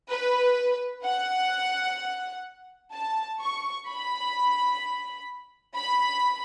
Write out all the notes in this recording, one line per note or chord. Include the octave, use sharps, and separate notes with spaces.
B4
F#5
A5
C#6
B5
B5